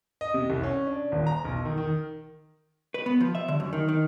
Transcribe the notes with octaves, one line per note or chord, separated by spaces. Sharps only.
D#5
C3
C2
C#4
D4
D#1
A#5
B1
D#3
D#3
B4
B3
F3
E5
D3
F#2
D#3
D#3